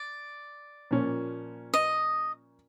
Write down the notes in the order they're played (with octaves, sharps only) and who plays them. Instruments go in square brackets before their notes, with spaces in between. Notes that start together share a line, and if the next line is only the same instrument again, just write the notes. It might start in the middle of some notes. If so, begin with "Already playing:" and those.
Already playing: [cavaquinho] D5
[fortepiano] A#2 F3 A#3 C#4
[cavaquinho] D#5